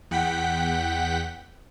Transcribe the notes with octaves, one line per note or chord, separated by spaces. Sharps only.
E2 F#5 G5 B6